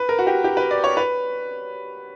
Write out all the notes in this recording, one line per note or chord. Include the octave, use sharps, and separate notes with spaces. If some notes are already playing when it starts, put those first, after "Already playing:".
Already playing: B4
A#4
F#4
G4
G4
B4
D5
C#5
B4